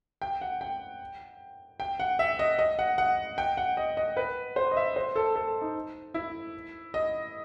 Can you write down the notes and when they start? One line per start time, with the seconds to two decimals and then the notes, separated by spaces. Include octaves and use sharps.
0.22 G5
0.41 F#5
0.61 G5
1.80 G5
2.00 F#5
2.19 E5
2.39 D#5
2.59 D#5
2.79 F#5
2.98 F#5
3.38 G5
3.57 F#5
3.77 D#5
3.97 D#5
4.17 B4
4.56 C5
4.71 D#5
4.77 E5
4.96 C5
5.16 A4
5.36 A4
5.62 D#4
6.14 E4
6.94 D#5